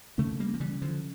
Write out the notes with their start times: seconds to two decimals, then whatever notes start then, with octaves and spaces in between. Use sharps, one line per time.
0.18 C#3 A3 C#4
0.40 G3 A#3
0.54 F3
0.60 C#3 E3 G3
0.82 D3 F3